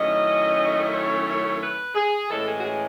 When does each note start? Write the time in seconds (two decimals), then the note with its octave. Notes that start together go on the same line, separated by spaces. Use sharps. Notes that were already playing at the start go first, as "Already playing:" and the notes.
Already playing: F#2 D#3 A3 C#4 E4 D#5
0.94 C#5
1.62 B4
1.95 G#4
2.29 A2 E3 G#3 C#4 A4
2.46 G#4
2.58 F#4
2.64 G#4